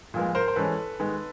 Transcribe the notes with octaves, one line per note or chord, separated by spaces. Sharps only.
A#2 F3 G#3 B3
A#4 C5
C5
E3 G#3 C#4 A4 B4
D#3 G#3 B3